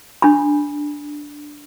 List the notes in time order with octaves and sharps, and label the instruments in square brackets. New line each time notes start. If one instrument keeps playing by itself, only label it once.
[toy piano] D4 B5